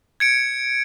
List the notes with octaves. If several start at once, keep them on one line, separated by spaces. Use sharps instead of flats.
G#6 C#7 D7